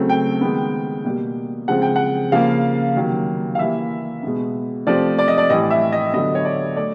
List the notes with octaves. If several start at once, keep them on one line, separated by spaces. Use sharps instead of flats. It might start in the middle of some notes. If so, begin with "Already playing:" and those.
Already playing: C#3 F#3 A3 C4
G5
D#3 G#3 B3
B2 G3 A#3
C#3 F3 G#3 C4 F#5
G5
F#5
C#3 F3 A#3 F5
C3 D#3 F#3 A#3
F5
E3 G3 A#3 E5
B2 G#3 B3
C3 F3 A3 C4 D5
D5
D#5
D5
A2 E3 G3 D#5
E5
D#5
D3 F#3 B3 D#5
C#5
D5
A3 D5